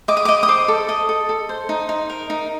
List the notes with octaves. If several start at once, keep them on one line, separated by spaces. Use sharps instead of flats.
D#5 D6
D#6
D6
D#5
D#6
C5 D6
A4
D#5 D#6
A4
A4
C5
D#4
D#4
A#4
D#4